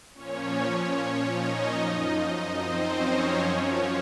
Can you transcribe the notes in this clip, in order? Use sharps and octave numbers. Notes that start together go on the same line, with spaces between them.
A#2 F3 C#4 C#5
D#4 D#5
F#2 F3
C4 C5
C#4 C#5
F#2 F3